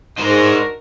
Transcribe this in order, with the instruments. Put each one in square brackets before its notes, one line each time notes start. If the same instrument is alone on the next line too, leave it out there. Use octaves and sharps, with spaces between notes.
[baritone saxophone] G#2 [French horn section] D4 F#4 A#4 [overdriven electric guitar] D#4 C5